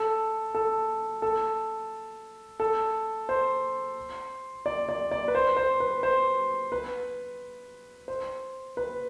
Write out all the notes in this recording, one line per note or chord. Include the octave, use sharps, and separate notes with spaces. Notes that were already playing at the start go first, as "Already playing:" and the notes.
Already playing: A4
A4
A4
A4
C5
D5
D5
D5
B4
C5
C5
B4
C5
B4
C5
B4